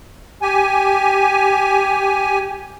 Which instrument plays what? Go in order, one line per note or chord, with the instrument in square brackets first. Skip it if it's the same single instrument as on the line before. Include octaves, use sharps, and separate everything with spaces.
[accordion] G4 G#5